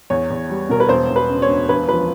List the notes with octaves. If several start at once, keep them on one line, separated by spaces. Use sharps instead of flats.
E2 C#5
E2
G3
B2 A#4
B4
E1 C5
E1
B4
C#3
C#5
D2
E1 B4
F3 B4